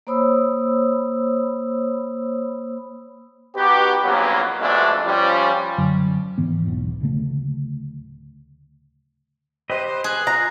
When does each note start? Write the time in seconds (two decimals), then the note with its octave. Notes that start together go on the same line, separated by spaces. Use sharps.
0.07 A#3 C5 C#5 B5 D#6 E6
3.55 B3 D#4 F#4 G4
4.04 A#1 D#2 C#3 F#3 A#3 B3
4.60 F2 B2 G#3 A3 D4
5.06 F3 G3 C#4
5.78 F#2 D3 F#3
6.38 D#1 G#2 E3 B3
6.66 E1 B1 E2
7.00 D1 D2 C#3 A3
9.70 G4 B4 C5 D#5
10.04 G#4 F#6
10.27 F4 A#5